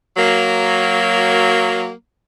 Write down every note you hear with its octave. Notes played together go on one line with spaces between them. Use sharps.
F#3 A#3